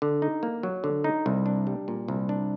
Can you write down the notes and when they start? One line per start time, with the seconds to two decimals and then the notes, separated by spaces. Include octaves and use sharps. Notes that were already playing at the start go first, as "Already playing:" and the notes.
0.02 D3
0.22 D#4
0.43 A#3
0.63 F#3
0.84 D3
1.04 D#4
1.26 C2
1.46 D4
1.67 G3
1.88 A#2
2.08 C2
2.29 D4